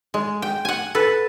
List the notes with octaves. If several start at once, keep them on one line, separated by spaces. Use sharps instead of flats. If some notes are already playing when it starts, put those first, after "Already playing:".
G#3
G5
F#5 G#5
A4 B4